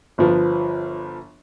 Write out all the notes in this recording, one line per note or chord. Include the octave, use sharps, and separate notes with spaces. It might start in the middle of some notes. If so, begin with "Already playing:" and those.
G1 F3 B4